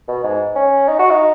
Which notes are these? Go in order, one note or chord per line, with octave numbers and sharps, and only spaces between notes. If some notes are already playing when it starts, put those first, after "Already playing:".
B2
G#2
C#4
D#4
F#4
D#4